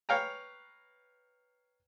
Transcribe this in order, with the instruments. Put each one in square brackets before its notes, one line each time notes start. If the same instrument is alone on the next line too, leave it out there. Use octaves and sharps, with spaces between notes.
[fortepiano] B4 C#5 F5 G5 A#5